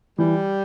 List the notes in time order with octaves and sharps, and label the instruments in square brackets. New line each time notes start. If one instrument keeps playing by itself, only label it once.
[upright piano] E3 [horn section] G3